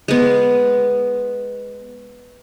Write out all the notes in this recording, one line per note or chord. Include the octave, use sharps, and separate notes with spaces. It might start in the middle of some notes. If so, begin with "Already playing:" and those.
G#3 B3